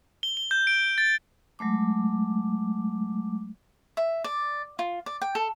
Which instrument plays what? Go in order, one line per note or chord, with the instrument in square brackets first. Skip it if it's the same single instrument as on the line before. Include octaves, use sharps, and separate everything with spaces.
[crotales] G7
G7
G6
D7
A6
[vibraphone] F#3 G#3 A3 D6
[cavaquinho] E5
D5
F4
D5
G5
A4